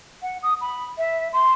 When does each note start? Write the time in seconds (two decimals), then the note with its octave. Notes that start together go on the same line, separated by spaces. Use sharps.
0.23 F#5
0.43 D#6
0.61 B5
0.98 E5
1.33 C6